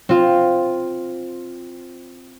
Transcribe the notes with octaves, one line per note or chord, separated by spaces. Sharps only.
C4 F4